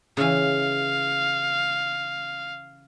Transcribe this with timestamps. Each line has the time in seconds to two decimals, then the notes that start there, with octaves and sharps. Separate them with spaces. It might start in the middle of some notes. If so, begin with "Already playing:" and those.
0.17 C#3 E3 F5